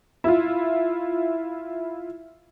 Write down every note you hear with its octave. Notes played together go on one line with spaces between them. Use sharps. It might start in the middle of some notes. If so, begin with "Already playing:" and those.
E4 F4